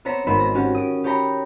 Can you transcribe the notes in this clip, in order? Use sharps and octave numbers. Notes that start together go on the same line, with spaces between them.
B3 C4 C#5 A#5 B6 E7
G#1 B3 C4 D#4 B5 E7
A#6
C#4 F#4 G4
D#6 D7
G4 C#5 G5 A#5 B5